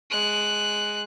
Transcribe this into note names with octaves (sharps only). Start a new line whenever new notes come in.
G#3 F#6